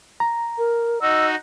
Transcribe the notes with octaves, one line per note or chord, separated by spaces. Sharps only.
A#5
A#4
D#4 F#4 D#5 E6